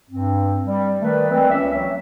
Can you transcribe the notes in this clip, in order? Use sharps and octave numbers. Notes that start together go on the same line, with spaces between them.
G2 C4
G3
D#3 G3 A3 B4
E3 G3 G#3 C4
C#2 A#3 C#4 E5
F#3